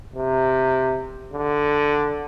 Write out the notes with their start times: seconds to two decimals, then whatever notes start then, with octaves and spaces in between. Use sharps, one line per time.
0.16 C3
1.33 D3